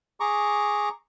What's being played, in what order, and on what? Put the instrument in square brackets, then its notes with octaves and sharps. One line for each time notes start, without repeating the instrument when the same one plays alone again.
[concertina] G#4 A#5 C#6 D6